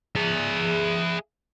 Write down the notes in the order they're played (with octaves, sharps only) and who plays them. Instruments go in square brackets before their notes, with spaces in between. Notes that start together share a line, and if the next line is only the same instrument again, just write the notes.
[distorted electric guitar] G#4 E5